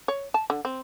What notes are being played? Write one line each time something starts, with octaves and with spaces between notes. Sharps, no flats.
C#5
A5
D3
C4